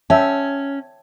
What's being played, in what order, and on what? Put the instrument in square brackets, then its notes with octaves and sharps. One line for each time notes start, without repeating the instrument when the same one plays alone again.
[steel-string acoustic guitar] C#4 [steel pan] E5 G5 A5